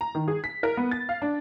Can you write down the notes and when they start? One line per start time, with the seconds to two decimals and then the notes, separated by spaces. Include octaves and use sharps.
0.01 A#5
0.15 D#3
0.28 G#4
0.44 B6
0.63 A#4
0.77 B3
0.91 A6
1.09 F5
1.22 D4